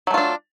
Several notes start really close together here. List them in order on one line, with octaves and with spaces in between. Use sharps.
F#3 A3 F4 D4